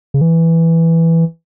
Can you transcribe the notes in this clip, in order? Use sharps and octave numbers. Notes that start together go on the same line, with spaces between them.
C#3
E3